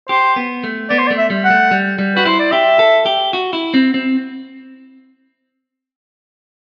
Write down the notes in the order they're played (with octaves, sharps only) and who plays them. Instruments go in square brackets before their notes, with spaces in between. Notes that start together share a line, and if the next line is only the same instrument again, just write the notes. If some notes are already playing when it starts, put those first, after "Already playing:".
[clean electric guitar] G4 [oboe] C5
[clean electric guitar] B3
A3
[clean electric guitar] B3 [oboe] D5
[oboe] C5
D5
[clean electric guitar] A3
[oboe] E5
[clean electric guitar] G3
[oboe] F#5
[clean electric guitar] A3
G3
G3
[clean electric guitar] F#4 [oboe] B4
[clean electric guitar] E4 [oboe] C5
[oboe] D5
[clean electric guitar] G4 [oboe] E5
[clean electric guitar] A4
G4
F#4
E4
C4
C4